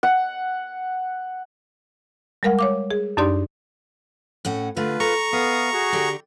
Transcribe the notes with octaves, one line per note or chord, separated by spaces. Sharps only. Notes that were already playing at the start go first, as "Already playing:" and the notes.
F#5
G3 G#3 A#4 F5 F#5
C#5 F5 D6
G#4
F#2 D4 D#4 G4 D5 C6
A2 C#4 F#5
D3 A3 F4 B4
A4 A#5 C#6
B3 E5 F5 D#6
F#4 G#4
D3 G4